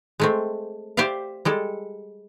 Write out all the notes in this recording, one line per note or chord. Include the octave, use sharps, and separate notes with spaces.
G#3 A3 C4
G4 C5 D5 E5 F5
G3 G#3 A4